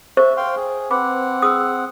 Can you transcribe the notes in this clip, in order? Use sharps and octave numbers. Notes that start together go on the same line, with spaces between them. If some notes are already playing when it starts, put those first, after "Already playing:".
C5 E5 C#6
F5 G5 C6
G#4
C4 B4 F#5 B5 D6
G#4 D#6 E6